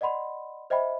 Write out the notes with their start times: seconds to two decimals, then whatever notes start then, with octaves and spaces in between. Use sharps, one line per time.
0.01 D5 D#5 F#5 B5 C6
0.70 C5 D#5 E5 G5 B5